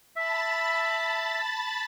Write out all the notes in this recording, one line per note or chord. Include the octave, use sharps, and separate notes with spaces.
E5 A5 B5 A6